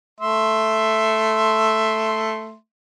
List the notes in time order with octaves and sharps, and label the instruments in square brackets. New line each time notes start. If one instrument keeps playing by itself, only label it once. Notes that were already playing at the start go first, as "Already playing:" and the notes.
[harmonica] A3 E5 C6